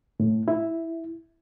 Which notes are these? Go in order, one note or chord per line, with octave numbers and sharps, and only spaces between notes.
A2
E4